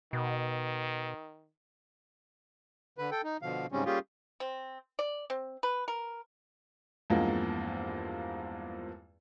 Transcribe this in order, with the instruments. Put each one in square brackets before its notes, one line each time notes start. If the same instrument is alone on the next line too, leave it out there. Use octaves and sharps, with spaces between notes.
[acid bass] B2 [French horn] D#3
[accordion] D3 B4
A4 G5
D#4
B2 D3 F3 F5
G#2 C#3 G3 C4 C#4
G3 A#3 C#4 F4 G4 G#4
[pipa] C4
D5
C4
B4
A#4
[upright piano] E2 G2 F3 G#3 A#3 C4